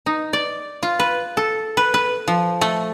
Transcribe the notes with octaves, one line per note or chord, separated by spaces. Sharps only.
D#4
D5
F4
B4
A4
B4
B4
F3
A3